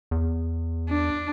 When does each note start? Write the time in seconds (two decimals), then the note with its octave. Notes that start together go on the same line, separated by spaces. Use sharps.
0.11 E2
0.89 D4